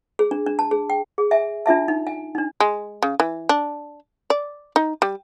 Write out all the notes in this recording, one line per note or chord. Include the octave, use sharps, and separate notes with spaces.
G#4
D4
D4
A5
G#4
G5
G#4
E5 G#5
D4 F4 E5 A5
D#4
G#5
D4 D#4
G#3
C#3
E3
D4
D5
D#4
G3